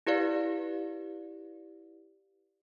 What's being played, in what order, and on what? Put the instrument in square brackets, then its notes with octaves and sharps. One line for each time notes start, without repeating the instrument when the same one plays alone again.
[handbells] E4 G4 B4 D5 F5